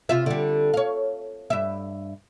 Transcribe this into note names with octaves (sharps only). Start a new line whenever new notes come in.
C3 F4 E5
D3 G3
C#5 F5
G2 E5